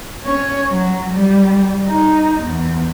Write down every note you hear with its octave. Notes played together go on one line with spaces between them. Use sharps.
C#4 C#5
F#3
G3
D#4
E2